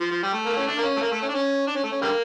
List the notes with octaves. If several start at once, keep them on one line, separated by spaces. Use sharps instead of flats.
F3
F3
G3
A3
A#3
C#4
D4
A#3
C#4
A3
A#3
A3
C#4
D4
C#4
D4
C#4
A3
C#4
D3 G3 A#3